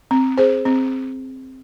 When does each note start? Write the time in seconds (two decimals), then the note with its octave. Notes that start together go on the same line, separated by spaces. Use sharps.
0.11 C4
0.38 G#4 C5
0.66 C4